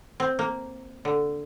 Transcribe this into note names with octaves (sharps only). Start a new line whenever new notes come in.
C4
A#3
D3